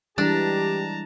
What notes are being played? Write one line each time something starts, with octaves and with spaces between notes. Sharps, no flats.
E3 G3 G#3 D4 G4 A5 A#5